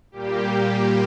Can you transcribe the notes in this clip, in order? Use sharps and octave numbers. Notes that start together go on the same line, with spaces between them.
A#2 G3 A#3 G4